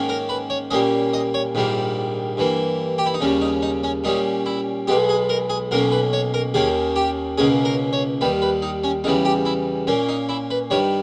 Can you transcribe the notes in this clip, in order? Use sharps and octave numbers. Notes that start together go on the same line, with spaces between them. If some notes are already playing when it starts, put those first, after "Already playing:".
Already playing: G#2 D#3 A#3 C#4
A#4
B4
C#5
A#2 G3 A#3 C#4 D#5
D#5
C#5
A#1 G#2 D#3 G3 A#3
G2 E3 A#3
G4
E4
D#4
D#2 C#3 G3 C#4
D#4
D#4
C#4
A#2 G3 C#4 D#4
E4
B1 B2 G#3 B3 G4
G#4
A#4
G#4
B1 B2 A#3 C#4 A#4
B4
C#5
A#4
D#2 D#3 A#3 C#4 G#4
G4
C#2 B2 A#3 C#4 G#4
A#4
C#5
D#2 D#3 G3 B4
B4
D#4
C#4
E2 C#3 E3 G3 D#4
G4
E4
A#2 A#3 C#4
D#4
E4
B4
G2 D#3 G3 C#5